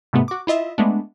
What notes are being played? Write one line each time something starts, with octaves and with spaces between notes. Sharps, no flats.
G#2 C3 A3 B3
F#4 D6
E4 F4 D#5 E5
G#3 A3 B3 D4